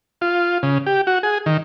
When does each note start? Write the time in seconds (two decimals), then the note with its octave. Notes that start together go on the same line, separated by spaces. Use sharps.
0.21 F4
0.63 C#3
0.86 G4
1.07 F#4
1.23 G#4
1.46 D#3